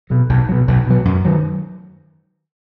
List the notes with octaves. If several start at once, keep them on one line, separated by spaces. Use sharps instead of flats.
B2 F#3
B1
B2 F#3
B1
B2 F#3
F#2
D#3 F#3